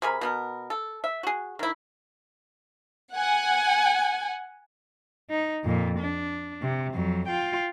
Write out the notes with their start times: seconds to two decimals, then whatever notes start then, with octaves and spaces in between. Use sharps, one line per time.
0.02 C3 G#4 A#4 B5
0.21 B2 B3 A#4
0.70 A4
1.04 E5
1.23 F#4 G#4
1.59 D#3 E4
3.12 F#5 G#5
5.30 D#4
5.64 F2 A#2
5.99 D4
6.62 C3
6.94 F2 F#3
7.28 F4 G5